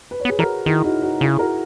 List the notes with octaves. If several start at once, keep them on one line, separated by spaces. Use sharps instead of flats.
B4
C#5
B3
G#4 B4
E3 F#4 A#4
D#3 E4 G#4
D#4 F#4
D#4 F#4
C#3 E4 G#4
F#4 A#4